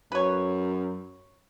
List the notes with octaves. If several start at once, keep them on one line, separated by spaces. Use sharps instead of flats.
F#2 B4 C#5